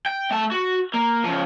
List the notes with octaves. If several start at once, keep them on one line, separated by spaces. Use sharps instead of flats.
G5
A3 A5
F#4
A#3
C#3 F3